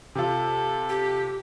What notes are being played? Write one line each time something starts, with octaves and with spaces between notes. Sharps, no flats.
C3 F4 A4
G4